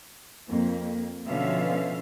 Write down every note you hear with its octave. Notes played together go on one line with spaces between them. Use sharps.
F2 A#3
B2 D3 F3 C#4 E5 F5